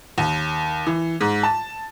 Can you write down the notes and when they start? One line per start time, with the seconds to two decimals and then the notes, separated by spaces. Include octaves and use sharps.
0.18 D#2
0.87 E3
1.21 G#2
1.43 A5